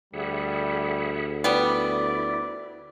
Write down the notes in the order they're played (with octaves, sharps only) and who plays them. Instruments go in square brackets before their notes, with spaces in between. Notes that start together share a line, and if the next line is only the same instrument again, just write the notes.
[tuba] D2 [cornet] G3 [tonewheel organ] G#4 E5 F#5
[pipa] G3 B3 [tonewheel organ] E4 [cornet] D5